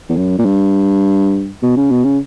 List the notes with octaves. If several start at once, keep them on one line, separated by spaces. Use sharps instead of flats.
E2
F#2
A#2
G2
B2
C#3
B2
C#3